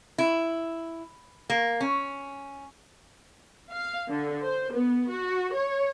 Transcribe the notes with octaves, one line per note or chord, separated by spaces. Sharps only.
E4
A#3
C#4
F5
D3
C5
B3
F#4
C#5